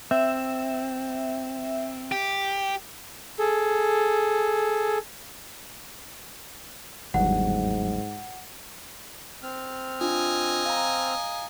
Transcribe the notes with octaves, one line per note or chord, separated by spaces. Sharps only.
C4 E5
G4
G#4 A4
G1 D#2 G#2 F#3 G3 F#5
C4 F6
D4 F4 D#5 G#5
F5 A#5